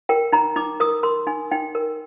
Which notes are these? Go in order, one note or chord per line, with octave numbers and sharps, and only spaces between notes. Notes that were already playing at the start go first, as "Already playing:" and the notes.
A#4 G5
D#4 A#5
D#4 D6
A#4 D#6
A#4 C6
D#4 G#5
D#4 G5
A#4